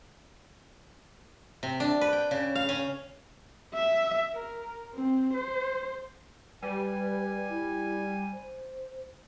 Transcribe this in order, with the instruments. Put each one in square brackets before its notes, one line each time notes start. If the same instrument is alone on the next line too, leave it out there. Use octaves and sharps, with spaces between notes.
[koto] C3
D4
B4
G5
C#3
F5
C#4
[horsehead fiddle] E5
A#4
C4
C5
[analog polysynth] G3 [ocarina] B4 [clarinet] G#5
[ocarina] E4
C5